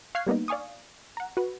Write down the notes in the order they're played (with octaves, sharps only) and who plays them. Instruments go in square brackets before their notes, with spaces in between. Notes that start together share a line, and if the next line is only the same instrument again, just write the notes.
[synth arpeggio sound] F5 C#6 F6 F#6 G#6 C7
G3 A#3 B3 D4 D#4
D5 F5 G#5 C#6 D#6
F#5 A#5
F#4 B4